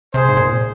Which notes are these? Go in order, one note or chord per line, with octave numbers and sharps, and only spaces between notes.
C3 G#4 C5
G#2
A#2